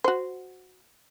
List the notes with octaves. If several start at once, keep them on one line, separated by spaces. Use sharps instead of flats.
F#4 C5